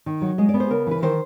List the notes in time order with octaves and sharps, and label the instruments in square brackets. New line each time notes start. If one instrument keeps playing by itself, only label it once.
[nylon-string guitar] D#3
F#3
G#3 D#5
D5
B3
C5
C#3 A#4
E3 B4
D#3 C5